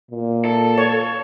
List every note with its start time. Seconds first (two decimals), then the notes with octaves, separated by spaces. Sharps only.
0.11 A#2
0.45 A4
0.78 C#5